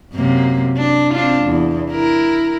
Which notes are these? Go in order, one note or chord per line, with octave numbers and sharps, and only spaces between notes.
F#2 C3 A#3
D4
C4 D4 F4
E2
E4 A#4